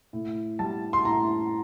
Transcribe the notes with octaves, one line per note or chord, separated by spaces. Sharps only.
A2
G3 A5
C6
A2 A#5